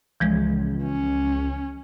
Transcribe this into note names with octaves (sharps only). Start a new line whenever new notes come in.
C#2 E3 F3 G#3
C#4